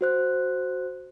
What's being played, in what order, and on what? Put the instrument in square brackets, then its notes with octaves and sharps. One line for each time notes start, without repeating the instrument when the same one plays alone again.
[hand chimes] F#4 C5 F#6